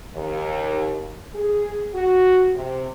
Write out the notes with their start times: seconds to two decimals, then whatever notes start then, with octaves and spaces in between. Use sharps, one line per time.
0.15 D#2
1.34 G#4
1.94 F#4
2.55 C3